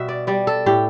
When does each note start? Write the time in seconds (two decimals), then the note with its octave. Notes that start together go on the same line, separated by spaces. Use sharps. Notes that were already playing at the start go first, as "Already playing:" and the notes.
Already playing: B2 G3 E5
0.08 D5
0.27 G3 D5
0.47 A4
0.66 A2 G4